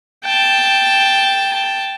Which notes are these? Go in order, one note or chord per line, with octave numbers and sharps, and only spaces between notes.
G5 A5